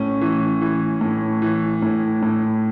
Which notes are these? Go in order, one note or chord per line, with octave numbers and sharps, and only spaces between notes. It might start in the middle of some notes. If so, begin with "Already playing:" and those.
Already playing: A2 C#4
E3
E3
A2
E3
A2
A2